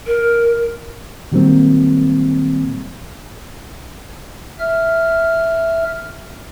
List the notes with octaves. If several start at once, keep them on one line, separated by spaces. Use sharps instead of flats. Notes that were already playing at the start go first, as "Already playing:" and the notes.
A#4
A#2 D#3 F#3 G3 A#3 C4
E5 F6